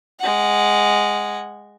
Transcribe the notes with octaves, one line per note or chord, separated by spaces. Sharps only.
G#3 F#5